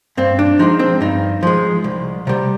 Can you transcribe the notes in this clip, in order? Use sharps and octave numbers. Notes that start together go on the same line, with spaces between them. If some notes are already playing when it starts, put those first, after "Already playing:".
G2 C4
D4
F3 G#3 D#4
C4
G2 D#4
F3 G#3
C2
C3 G3